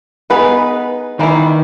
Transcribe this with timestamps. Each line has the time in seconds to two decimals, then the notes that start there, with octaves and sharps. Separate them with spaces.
0.30 B3 D#4 G#4 B4
1.19 D#3 E3 A#3 E4